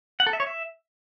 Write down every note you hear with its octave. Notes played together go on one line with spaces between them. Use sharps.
F#5
A4
E5
C#5
E5